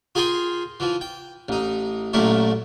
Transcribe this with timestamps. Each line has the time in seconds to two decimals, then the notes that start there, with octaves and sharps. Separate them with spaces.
0.15 F4 G#4 A#4 G5 G#5 C6
0.80 E3 F3
1.01 G5
1.49 A1 D#4
2.13 A1 F#2 A#2 A3 E4 A#4